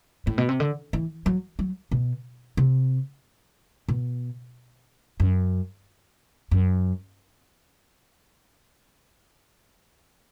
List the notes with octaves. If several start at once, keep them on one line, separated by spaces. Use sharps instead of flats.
A2
B2
C3
D3
E3
F#3
F#3
B2
C3
B2
F#2
F#2